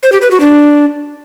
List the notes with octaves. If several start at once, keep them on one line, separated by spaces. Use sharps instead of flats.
C5
G4
B4
F#4
D4